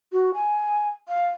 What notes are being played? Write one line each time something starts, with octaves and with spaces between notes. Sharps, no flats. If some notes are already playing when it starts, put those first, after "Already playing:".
F#4
G#5
F5